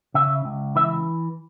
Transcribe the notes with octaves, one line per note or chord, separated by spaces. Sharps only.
C#3 E5
C#2
E3 E5